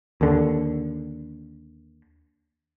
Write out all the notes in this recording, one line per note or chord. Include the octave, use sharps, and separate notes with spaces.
D#2 D3